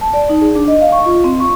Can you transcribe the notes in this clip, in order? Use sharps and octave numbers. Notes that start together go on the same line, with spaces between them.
A5
D5
D#4
G#4
D4
D#5
F5
C#6
F4
C4
C#6